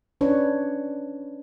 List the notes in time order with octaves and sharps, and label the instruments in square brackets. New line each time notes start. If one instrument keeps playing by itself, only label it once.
[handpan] C#4 D4 B4 C#5